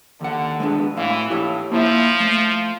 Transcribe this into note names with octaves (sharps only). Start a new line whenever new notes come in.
D#2 D3 F#5
G#3 B3 D4
A2 E3 F5
A2 E4 G4 C#5
F3 A#3 E4 E5
A3